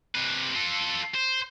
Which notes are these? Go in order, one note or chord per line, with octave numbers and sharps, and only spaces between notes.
C3 B4
F4 A4
C5